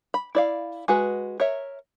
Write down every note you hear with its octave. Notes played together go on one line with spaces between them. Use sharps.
B5
E4 D5 F5
G#3 F#4 B4
A#4 C#5 E5